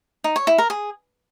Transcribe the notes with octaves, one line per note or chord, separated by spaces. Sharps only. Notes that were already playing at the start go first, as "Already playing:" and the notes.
D#4
C#5
E4
A#4
G#4